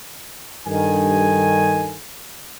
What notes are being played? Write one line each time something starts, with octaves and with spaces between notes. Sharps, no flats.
G2 D#3 A4 G#5